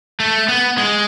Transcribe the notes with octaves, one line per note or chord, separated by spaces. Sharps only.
A3
B3
G#3